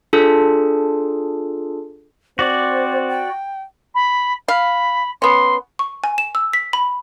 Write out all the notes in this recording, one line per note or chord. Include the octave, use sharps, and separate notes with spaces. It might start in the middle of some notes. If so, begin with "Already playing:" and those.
D4 F4 G#4 A4
C4 F#4 C5 D5
G5
B5
F5 B5
B3 C#4 C6
C#6
G#5
E7
E6
B6
B5